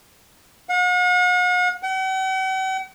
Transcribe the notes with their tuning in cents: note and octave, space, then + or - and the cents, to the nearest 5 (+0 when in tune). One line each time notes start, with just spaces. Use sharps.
F#5 -45
F#5 +45